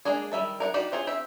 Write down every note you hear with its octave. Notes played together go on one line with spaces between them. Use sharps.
G#3 A#3 D4 G#4
D#3 G3 E5 A5
A#4 F5 F#5
D#4 F#4 G4 D5 F5
C4 F4 G#4 C#5
C4 G4 E5